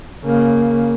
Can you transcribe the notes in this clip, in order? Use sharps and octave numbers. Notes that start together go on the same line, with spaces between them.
C#3 A#3